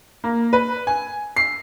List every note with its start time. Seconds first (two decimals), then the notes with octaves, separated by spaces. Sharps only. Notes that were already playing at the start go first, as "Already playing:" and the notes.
0.24 A#3
0.53 B4
0.87 G#5
1.37 C7